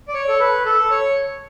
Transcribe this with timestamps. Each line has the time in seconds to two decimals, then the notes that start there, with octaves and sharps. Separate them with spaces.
0.08 D5
0.14 C#5
0.28 A4
0.40 B4
0.66 A4
0.91 C#5